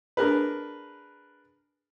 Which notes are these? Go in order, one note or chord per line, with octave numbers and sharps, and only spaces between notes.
D4 G#4 A#4 B4